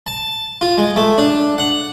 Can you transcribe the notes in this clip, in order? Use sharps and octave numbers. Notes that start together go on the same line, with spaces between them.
A5
F4
G#3
A3
D4
F#5